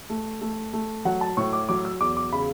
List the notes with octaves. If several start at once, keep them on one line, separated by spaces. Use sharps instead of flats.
A3
A3
A3
F#3 F#5
A5
A2 C#6
D6
F#3 D6
E6
E2 D6
D6
C#3 B5